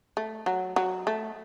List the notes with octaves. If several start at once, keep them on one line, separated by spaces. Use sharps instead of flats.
A3
F#3
F#3
A3